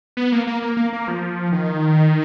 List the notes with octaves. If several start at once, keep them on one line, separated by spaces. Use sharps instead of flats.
B3
A#3
A#3
A#3
A#3
A#3
F3
D#3